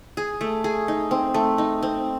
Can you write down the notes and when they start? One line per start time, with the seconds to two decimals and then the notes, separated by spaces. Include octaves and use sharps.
0.17 G#4
0.41 A3
0.64 G#4
0.88 D#4
1.11 C4
1.34 A3
1.58 D#4
1.82 C4